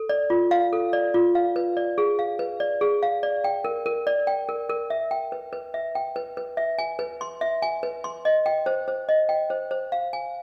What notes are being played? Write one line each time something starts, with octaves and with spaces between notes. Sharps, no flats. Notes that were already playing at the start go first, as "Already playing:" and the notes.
Already playing: A4
D5
F4
F5
A4
D5
F4
F5
B4
D5
G#4
F5
B4
D5
G#4
F5
D5
G5
A#4
A#4
D5
G5
A#4
A#4
E5
G5
B4
B4
E5
G5
B4
B4
E5
G#5
B4
C6
E5
G#5
B4
C6
D#5
G5
C5
C5
D#5
G5
C5
C5
F5
G#5